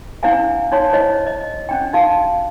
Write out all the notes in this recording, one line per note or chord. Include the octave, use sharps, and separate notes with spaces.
C#4 D4 E4 C5 F5 G#5
D4 D#4 C#5 C6
E4 C5 C#5 D#5
D#5
C#4 D4 G5
D#4 F#4 F5